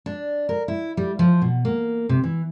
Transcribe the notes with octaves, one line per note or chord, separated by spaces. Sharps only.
D4
A#4
E4
G3
F3
B2
A#3
C3
E3